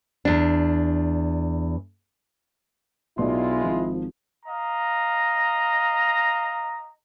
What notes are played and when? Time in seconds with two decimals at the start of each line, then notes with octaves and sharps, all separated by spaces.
0.25 E2 D4
3.18 B1 B2 G#3 E4 F4 D5 C6
3.63 G#1 F3
4.46 D#5 F5 A#5